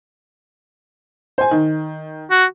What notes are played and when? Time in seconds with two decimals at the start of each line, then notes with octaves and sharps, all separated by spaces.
1.38 C5 G#5
1.51 D#3
2.31 F#4